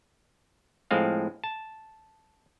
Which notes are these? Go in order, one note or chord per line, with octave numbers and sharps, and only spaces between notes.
A2 F3 G#3 C4 F5
A5